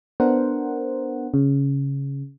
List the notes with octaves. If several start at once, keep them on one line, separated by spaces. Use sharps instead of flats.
B3 D4 A#4 C5 F#5
C#3